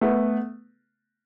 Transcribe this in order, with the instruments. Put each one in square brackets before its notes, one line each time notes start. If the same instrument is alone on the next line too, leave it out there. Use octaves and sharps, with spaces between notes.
[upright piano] A3 B3